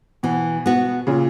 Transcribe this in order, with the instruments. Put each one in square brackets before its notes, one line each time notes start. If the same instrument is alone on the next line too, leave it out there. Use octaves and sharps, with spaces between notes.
[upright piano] B2 [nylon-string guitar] E3
[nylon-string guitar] B3 F#4
[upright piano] A#2 C#3